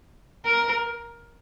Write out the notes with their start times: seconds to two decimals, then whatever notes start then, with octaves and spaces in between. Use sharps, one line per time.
0.45 A#4